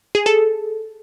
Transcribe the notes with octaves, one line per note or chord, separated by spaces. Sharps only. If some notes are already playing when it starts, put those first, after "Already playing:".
G#4
A4